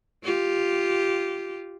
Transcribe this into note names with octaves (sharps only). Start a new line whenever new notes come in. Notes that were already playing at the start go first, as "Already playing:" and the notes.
F4 G4